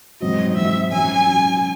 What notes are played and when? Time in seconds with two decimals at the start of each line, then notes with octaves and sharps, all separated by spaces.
0.20 G#2 F#3 C4 F#4 D#5
0.55 G#2 F#3 C4 F#4 E5
0.91 F#3 C#4 F#4 G#5
1.26 F#3 C#4 F#4